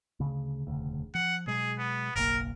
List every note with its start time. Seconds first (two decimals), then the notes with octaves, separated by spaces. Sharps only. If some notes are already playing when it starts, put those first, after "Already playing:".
0.20 D2 C#3
0.67 E1 D2 C#3
1.15 F3 F#5
1.47 B2 F#3 G#3 G#4
1.78 B3
2.16 F#1 B1 A#3 A#4